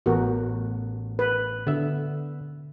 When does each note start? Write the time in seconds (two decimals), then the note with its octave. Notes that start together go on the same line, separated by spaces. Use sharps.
0.06 A1 B3 F#4 A#4
1.19 B4
1.67 D3 B3 E5